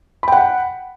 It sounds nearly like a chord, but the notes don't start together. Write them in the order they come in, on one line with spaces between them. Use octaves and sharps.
B5 G5 F#5